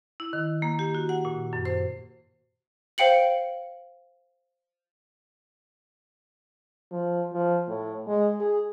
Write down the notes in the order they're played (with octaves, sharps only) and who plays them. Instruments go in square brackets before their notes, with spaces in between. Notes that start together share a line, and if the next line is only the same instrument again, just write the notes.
[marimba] E4
D#3
A#3
G4
F#4
F#5
A#2
F#2
C5
[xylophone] C5 F5 G5 C#7 F#7
[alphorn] F3
F3
A2
G#3
G#4